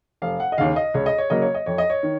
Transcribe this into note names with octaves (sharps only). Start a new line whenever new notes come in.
F1 F5
F#5
D#5
D#2 C#3 F5
D#5
C#2 C#5
D#5
C#5
C#3 F#3 A#3 D#5
C#5
D#5
F2 C#5
D#5
C#5
D#3